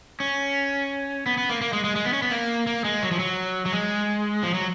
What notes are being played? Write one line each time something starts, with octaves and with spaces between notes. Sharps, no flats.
C#4
B3
B3
A#3
A#3
G#3
G#3
G#3
B3
C#4
B3
A#3
A#3
G#3
F#3
F3
F#3
F#3
G#3
F3
F#3